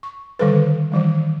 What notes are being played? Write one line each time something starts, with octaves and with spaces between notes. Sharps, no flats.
C#6
D3 D#3 G3 A4 B4
D#3 E3 G3